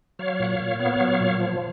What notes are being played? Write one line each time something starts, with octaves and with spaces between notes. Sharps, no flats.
F#3 C#5 F5
A#2 F#5
C#5 F5
A#2
B3 C#5 F5
F#3
A#2
F3